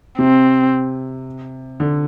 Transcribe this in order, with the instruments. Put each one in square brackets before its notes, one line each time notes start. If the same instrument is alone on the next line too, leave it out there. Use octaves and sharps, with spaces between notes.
[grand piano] C3 [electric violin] C4
[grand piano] D3